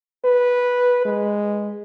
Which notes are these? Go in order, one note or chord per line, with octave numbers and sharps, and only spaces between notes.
B4
G#3